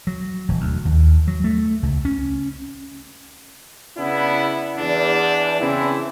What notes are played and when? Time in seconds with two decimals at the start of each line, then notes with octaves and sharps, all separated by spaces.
0.07 F#3
0.49 E1
0.61 D2
0.85 D#2
1.28 F#3
1.44 A3
1.83 C#2
2.05 C#4
3.97 C#3 B3 D4 E4
4.78 E2 D4
5.60 C#3 E3 C4 E4